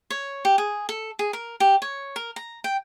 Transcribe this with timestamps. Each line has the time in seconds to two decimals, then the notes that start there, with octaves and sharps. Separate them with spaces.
0.10 C#5
0.45 G4
0.58 G#4
0.89 A4
1.19 G#4
1.33 A#4
1.60 G4
1.82 C#5
2.16 A#4
2.36 A#5
2.64 G5